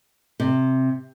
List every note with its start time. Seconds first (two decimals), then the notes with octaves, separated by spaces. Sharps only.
0.40 C3